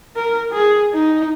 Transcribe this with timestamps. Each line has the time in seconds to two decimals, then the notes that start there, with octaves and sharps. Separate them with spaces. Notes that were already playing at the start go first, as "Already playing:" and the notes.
0.16 A#4
0.53 G#4
0.94 D#4